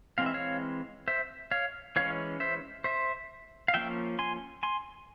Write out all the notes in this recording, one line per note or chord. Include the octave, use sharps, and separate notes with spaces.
E3 G#3 C4 F5
E5
C#5 F5
C5 E5
C#5 F5
E3 G#3 C#4 C#5 F5
C5 E5
C5 E5
F5
F3 A#3 C#4 E5 G5
G#5 C6
G#5 C6